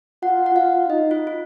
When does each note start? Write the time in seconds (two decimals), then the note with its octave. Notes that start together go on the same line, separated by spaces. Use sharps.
0.22 F4 F#5
0.46 F#5
0.55 F4 F5
0.89 D#4 D#5
1.11 F4
1.27 F4